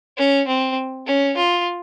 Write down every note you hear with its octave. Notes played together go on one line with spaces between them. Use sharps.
C#4
C4
C#4
F4